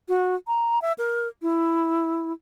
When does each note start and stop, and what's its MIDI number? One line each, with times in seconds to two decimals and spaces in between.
0.09 0.35 66
0.48 0.81 82
0.82 0.93 76
0.98 1.28 70
1.42 2.33 64